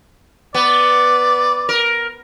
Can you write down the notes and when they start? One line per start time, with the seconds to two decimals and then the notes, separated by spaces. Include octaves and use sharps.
0.54 B3 D5
1.69 A#4